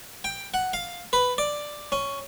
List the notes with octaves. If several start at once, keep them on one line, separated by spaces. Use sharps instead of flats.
G5
F#5
F5
B4
D5
C#4